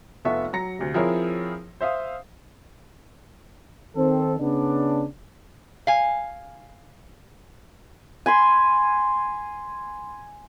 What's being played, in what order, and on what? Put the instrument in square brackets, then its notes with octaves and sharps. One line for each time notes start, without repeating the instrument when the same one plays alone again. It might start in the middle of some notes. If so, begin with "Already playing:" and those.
[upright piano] F1 B3 F4 A4 E5 C#6
F#3 A#5 A#6 C#7
D2 C3
F3 C4 E4 G#4 A#4 C#5
C5 E5 F5 D#6
[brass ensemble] D#3 C4 A4
C#3 B3 C#4 D4
[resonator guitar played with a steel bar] F5 G#5
[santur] G#5 B5 C6